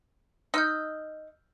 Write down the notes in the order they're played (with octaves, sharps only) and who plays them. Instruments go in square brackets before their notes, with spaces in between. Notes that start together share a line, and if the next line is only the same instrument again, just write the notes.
[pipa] D#4 D#5 [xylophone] E6 F6 G6